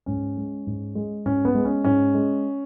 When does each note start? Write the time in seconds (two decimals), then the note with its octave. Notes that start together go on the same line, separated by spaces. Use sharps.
0.06 G#2 C#4
0.37 G#3
0.67 G#2
0.95 G#3
1.25 G#2 C#4
1.45 B3
1.55 G#3
1.65 C#4
1.84 G#2 C#4
2.14 G#3